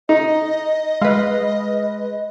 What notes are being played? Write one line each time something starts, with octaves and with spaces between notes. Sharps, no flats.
D#4 D#5
G#3 B4 F5